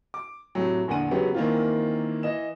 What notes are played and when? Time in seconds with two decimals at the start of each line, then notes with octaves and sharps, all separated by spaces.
0.14 D6
0.55 A2 C3 F#3
0.88 A#1 E2 D3 F#5 D#7
1.11 C#3 F#3 G#3 B3 G4 B4
1.34 D#3 E3 A#3 C4 F4
2.23 E3 D#5 E7